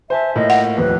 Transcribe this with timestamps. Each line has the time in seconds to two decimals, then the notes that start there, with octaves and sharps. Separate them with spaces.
0.10 C5 E5 G#5 A5
0.36 A2 A#3 F4 D#5
0.50 F#5
0.77 D#1 F2 A2 B4